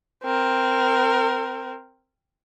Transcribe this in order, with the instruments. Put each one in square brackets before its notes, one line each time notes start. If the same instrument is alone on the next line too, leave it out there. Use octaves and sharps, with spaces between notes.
[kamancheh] C4 A#4